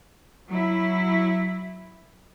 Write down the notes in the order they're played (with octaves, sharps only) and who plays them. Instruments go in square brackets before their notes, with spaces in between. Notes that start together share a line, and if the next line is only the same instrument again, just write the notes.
[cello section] F#3 E4